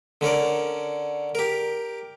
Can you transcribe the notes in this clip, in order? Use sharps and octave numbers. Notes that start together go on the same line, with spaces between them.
D3 C#4 A#4 D5
G4 A#4